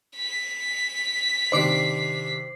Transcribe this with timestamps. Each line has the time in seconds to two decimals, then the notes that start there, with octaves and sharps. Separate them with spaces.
0.17 B6
1.52 C3 D#3 D4 C5 D6 C7